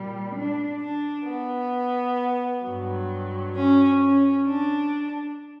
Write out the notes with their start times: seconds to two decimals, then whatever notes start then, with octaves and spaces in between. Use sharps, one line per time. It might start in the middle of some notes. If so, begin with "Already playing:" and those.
Already playing: A#2 G3
0.35 D4
0.81 D4
1.26 B3
2.63 G2 F#3
3.54 C#4
3.99 C#4
4.45 D4